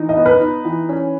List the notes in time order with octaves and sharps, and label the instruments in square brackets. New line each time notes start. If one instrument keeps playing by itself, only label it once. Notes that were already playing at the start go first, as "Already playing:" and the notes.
Already playing: [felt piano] E3 D#4
[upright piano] D#5
[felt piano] B3
[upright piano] B4
[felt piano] D#4
E3
C#4